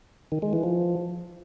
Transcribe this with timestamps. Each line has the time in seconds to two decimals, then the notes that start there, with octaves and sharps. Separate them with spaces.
0.32 D#3
0.42 G#3
0.53 E3
0.63 F3